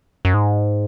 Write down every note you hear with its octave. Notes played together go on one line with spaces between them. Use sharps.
F#2
G#2